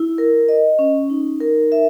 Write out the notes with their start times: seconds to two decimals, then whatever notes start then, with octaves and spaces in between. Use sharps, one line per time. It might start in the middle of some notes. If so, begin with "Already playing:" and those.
Already playing: E4
0.18 A#4
0.49 D#5
0.79 C#4
1.10 D#4
1.40 A#4
1.72 E5